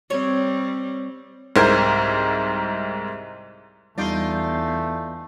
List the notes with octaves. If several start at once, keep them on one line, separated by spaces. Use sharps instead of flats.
G3 C4 C#5
C2 G#2 A#4 C5 G#6
E2 G3 A3 D#4 F4 D5 G6 C7